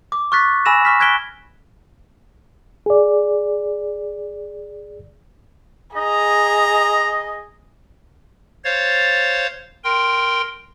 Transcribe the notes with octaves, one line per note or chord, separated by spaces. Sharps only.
D6
C#6 F6 F#6 A6 B6
G#5 B5 E6 A#6 E7
C#6 F6 B6
F6 F#6 G#6 B6 D7 G7
G#4 D5
G#4 D#5 A#5
C5 C#5 F5 A6
A#4 G5 C6